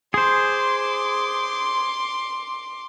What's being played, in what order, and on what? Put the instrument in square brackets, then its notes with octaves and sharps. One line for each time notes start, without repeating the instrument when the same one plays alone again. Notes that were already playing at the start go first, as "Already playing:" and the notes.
[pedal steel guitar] G#4 C5 [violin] C6 D6